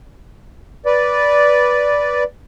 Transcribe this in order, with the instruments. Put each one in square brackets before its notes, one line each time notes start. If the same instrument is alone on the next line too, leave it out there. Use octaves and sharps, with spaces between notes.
[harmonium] B4 D5